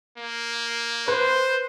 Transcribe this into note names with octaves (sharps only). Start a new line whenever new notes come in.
A#3
B4 C5